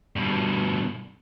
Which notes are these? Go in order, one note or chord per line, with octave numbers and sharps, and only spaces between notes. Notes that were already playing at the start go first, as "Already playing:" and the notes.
G2 B2